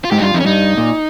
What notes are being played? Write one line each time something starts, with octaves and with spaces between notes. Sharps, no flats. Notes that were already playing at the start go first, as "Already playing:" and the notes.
F4
G#2 G4
D#4
G2 F4
F2 D#4
C#4
G2 D#4
A#2